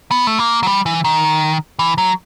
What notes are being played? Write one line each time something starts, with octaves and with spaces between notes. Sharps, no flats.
B3
A3
A#3
F#3
G3
E3
D#3
E3
F#3